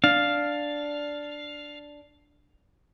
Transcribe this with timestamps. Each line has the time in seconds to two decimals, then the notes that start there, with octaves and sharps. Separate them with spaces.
0.04 D4 F5